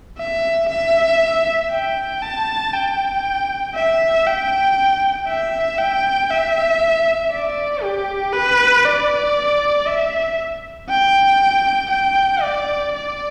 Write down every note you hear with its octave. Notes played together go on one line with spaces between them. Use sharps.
E5
E5
G5
A5
G5
E5
G5
E5
G5
E5
D5
G4
B4
D5
E5
G5
G5
D5
D5